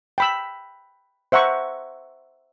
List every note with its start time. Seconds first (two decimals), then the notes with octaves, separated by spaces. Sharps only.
0.18 G5 B5 E6
1.32 C5 E5 F#5 A#5 C#6